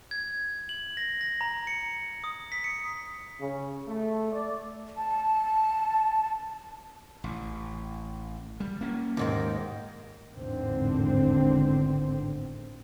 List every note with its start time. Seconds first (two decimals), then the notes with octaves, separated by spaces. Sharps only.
0.11 G#6
0.69 F#7
0.97 A#6
1.21 A#6
1.41 A#5
1.67 C#7
2.24 D#6
2.52 B6
2.64 C#7
3.41 C#3
3.88 A3
4.33 D5
4.97 A5
7.24 A1
8.60 G3
8.81 A#3 C#4
9.17 D#2 G#2 D#3
10.36 G#1 E2 A2 D3 C4